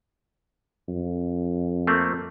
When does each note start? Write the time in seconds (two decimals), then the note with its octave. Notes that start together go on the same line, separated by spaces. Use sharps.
0.88 F2
1.87 A3 A#3 C4